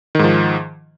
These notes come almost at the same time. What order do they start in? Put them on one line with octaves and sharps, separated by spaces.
D#3 G#2 F3